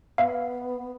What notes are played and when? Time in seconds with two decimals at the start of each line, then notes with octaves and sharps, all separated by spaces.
0.18 B3 E5 F5